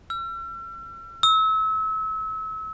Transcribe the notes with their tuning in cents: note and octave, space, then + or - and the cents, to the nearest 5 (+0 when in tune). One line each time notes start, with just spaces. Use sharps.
E6 +45
E6 -30